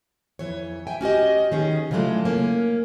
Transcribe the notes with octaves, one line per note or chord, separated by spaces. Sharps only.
F2 E3 C#5
E5 G5 G#5
C#4 F#4 G4 D#5
D#3 B3 C#4 G#4
C#3 E3 F#3 G#3 A3 F4
A#3 C#4